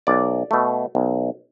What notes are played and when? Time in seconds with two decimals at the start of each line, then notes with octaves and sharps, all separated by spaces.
0.07 B1 D5
0.51 B2 A3
0.95 B1